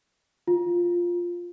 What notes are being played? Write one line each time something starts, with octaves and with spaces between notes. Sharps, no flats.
F4